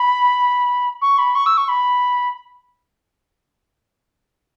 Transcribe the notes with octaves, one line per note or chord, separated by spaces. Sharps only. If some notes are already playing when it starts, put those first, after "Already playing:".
Already playing: B5
C#6
B5
C#6
E6
C#6
B5